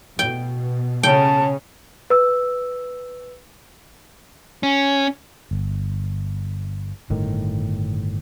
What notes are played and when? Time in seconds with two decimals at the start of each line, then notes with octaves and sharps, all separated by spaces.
0.19 B2 G5
1.03 C#3 C#4 G5 A5
2.10 B4 E6
4.63 C#4
5.51 G1
7.10 G1 A2 D#3